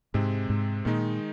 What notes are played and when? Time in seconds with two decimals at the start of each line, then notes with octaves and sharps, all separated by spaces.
0.14 G#2 C3 G#3 C4
0.50 G#2
0.85 A#2 D#3 G#3 D#4